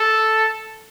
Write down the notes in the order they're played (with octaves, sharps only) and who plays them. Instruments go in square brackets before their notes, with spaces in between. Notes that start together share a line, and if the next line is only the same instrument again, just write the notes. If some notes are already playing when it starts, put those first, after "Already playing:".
Already playing: [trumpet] A4